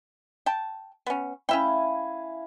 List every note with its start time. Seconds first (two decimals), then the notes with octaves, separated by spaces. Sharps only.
0.46 G5 A5
1.07 B3 C#4
1.49 C#4 E4 E5 F5 G5 G#5